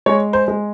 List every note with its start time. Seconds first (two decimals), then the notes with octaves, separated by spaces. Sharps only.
0.06 G#3 C#5
0.33 C5
0.48 G#3